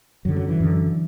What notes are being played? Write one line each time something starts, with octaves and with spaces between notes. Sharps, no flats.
F#2 D3 F#3
F#3
E3
F#2 D3